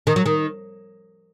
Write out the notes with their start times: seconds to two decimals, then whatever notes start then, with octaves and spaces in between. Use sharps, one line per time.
0.07 D#3
0.16 F#3
0.26 D#3